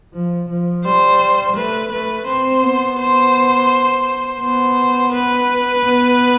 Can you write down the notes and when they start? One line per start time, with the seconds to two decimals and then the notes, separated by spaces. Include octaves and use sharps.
0.14 F3
0.50 F3
0.85 G3 C5
1.56 A3 B4
1.92 A3 B4
2.27 C4 C5
2.63 B3
3.00 C5
4.41 B3 C5
5.13 B4
5.84 B3